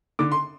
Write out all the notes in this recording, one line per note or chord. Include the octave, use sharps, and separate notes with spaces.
D3 D6
C6